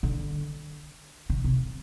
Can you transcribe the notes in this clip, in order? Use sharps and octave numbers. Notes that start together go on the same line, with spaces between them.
D3
D3
C3